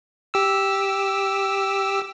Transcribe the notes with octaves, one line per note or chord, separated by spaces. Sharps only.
G4 E6